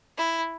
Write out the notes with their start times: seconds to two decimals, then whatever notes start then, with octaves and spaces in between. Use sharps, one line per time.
0.17 E4